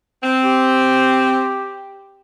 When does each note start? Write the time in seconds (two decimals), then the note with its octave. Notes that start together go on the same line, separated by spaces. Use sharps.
0.23 C4
0.43 G4